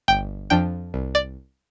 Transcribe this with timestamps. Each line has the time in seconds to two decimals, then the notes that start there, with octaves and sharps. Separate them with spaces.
0.08 G1 G5
0.50 F2 F3 D4 G5
0.94 C2
1.15 D5